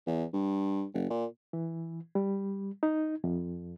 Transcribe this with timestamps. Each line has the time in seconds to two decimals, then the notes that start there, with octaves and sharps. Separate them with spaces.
0.07 E2
0.33 G2
0.94 F#1
1.10 A#2
1.53 E3
2.15 G3
2.83 D#4
3.24 F2